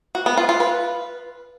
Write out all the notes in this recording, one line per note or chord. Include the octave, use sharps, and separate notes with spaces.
F#4
B3
F4
F4
B4